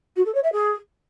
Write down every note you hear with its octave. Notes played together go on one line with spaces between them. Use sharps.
F#4
A4
C#5
E5
G#4